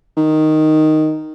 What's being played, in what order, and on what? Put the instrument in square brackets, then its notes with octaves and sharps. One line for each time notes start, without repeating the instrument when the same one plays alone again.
[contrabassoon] D#3